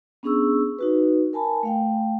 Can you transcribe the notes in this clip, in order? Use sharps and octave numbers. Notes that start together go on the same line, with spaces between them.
B3 C#4 D4 G#4 C#6 E6
D#4 F#4 B4
A#4 G#5 A5 B5
A3 F5 G5